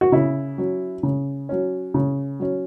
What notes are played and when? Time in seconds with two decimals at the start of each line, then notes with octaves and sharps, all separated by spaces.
0.01 F#4
0.12 C#3 E4
0.58 F#3 C#4
1.03 C#3
1.49 F#3 C#4
1.94 C#3
2.40 F#3 C#4